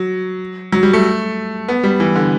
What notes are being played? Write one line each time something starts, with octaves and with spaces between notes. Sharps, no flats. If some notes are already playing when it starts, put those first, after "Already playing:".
Already playing: F#3
F#3
G3
A3
B3
G3
E3
D3